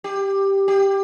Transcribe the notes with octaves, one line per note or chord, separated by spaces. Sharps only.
G4
G4